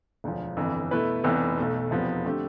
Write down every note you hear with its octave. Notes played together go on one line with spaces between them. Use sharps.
E1 D2 D3 F3
G1 F2 E3
B2 A3 E4 B4
F1 F2 E3 B3
B1 B2 A3
F1 E2 C3 F3 B3
D3 A3 C4 G4